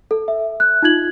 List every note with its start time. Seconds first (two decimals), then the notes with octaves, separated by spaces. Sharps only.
0.11 A4
0.28 E5
0.60 F#6
0.83 D#4 F4 G#6 F#7